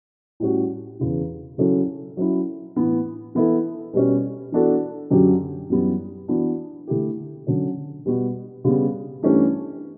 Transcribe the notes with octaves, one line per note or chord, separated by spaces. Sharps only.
A2 G3 C#4 F#4
E2 C#3 E3
C#3 F#3 C#4 E4 A4
F#3 C#4 E4
A2 E3 B3
E3 B3 E4 A4
B2 G3 C#4
E3 B3 D4 F#4 A4
F#2 D3 F#3 C#4 G4
F#2 E3 G3 B3
E3 B3 D4 F#4
D3 A3 E4 G4
D3 F#3 C#4
B2 G3 B3 F#4
C#3 G3 B3
G2 E3 A3 C#4 G4